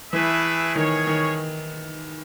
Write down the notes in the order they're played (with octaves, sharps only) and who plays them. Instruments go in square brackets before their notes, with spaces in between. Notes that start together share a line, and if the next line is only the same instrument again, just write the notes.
[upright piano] E3 [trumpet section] A3 E4 G#4 B4 E5
[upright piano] D#3 [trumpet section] C#4 G#4 C#5
[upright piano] D#3